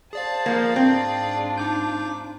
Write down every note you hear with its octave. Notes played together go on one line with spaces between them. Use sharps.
G#4 C5 D5 F5 A5
F3 A#3
G#2 C4 D4 F4
D#4 D6 G6